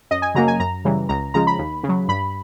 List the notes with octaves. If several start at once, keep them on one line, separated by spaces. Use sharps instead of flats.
F#2 D#5
G#5
C#3 F#3 A#3 A#5
G#5
F#2 A#5
C#3 E3 G3
C#2 A#5
C#3 F3 G#3 A#5
B5
D#2
C#3
F#3
G2 B5